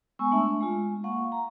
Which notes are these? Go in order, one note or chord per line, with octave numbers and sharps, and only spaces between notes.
G#3 B3 G#5 C#6 E6
A3 D4 E5 A5 C#6
G#3 F4
A#3 F5 F#5 C#6
A#5